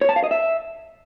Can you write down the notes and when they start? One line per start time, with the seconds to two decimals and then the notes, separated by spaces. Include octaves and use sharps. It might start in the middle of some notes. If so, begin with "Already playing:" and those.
0.01 C#5
0.09 A5
0.16 F5
0.24 D#5
0.31 E5